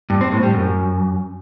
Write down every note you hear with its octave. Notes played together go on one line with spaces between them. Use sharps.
G2
C4
A2
G3
F#2